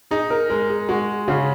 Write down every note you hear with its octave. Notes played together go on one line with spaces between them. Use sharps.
D#4 G#4
A#4
G#3 A#4
G#4
G#3 F#4
C#3 F#4